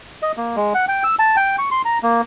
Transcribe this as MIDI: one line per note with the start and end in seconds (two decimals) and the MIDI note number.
0.22 0.32 75
0.37 0.56 58
0.56 0.73 56
0.74 0.85 78
0.88 1.03 79
1.04 1.15 88
1.19 1.36 81
1.36 1.56 79
1.59 1.69 85
1.71 1.82 84
1.85 1.98 82
2.03 2.21 58